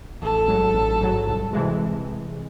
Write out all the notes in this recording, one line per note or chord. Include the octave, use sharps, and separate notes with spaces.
A1 A4
G#2 F#3
A1
G#2 F#3
C2
C3 E3 G#3